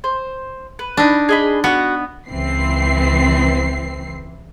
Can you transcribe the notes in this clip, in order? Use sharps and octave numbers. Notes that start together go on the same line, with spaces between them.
C5
B4
D4 D#4
G#4 D#5 B5
B3 F#4 F#5
C#2 E3 C4 C7